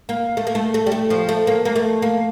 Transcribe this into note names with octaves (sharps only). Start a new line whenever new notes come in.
A#3
A3
A#3
A3
A3
G3
A3
F3
A3
A#3
A#3
A3
A#3